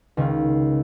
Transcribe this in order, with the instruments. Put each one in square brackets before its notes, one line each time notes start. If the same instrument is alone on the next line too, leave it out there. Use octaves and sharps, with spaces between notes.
[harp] C#2 D#3